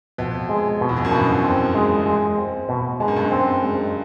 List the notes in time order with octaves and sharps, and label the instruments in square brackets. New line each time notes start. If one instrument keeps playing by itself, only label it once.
[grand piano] F2 [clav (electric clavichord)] B2
[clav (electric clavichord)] G#3
B2
[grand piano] E2
F2
F#2
[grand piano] G2 [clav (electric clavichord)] B2
[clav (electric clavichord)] C4
G#3
G#3
C4
B2
[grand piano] G2 [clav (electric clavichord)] G#3
[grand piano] F#2
G2
[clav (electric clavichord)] C4
G#3